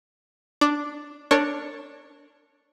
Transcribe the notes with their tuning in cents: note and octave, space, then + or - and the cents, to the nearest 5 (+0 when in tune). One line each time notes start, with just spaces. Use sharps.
D4 +0 D6 +0
D4 +0 A#4 -30 C#5 -5